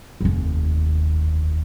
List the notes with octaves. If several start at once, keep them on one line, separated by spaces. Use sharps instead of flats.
F1 D#2